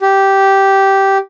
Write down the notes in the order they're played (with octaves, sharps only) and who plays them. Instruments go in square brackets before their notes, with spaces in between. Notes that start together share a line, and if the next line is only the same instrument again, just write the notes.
[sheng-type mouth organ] G4